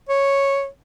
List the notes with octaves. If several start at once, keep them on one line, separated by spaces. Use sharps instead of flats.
C#5